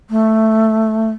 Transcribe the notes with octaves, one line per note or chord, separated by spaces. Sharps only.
A3